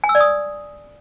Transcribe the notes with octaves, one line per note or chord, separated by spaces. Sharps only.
G#5
E6
D5
D#6